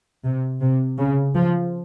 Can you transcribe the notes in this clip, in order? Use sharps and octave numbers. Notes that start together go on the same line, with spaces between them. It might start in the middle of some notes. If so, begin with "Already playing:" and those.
C3
C3
C#3
F3